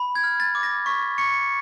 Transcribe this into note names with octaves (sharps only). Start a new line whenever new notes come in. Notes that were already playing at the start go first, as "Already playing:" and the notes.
Already playing: B5
G#6
F6
A6
D6
A#6
C#6 B6
C#6 C#7